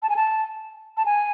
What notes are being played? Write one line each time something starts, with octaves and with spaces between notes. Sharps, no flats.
A5
G#5
A5
A5
G#5